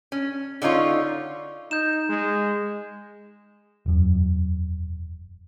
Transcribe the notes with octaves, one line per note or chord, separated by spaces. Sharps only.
C#4
D3 C#4 D#4 F4 C#5
D#4 G6 E7
G#3
E1 F#2